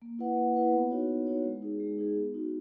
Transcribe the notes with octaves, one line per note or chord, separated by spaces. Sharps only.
A#3
E4 B4 F#5
A#3
E4 B4 F#5
B3
D#4 F#4 C#5
B3
D#4 F#4 C#5
G#3
D#4 G#4
G#3
D#4 G#4
B3
D#4 F#4